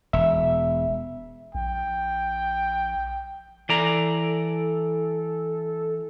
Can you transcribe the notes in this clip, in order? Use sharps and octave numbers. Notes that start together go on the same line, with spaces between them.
E1 E5
A#1 G5
E3 A4 D5 A#5